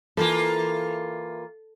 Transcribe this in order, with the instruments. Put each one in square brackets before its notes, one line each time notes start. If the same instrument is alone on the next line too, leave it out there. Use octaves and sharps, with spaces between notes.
[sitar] E3 A#3 F4 [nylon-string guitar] A4